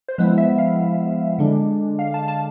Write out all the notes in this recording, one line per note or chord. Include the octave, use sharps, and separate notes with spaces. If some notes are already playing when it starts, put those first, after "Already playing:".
C5
F3 G#3 B3 E4 B4
E5
F5
D3 G#3 D4
F5
A5
A5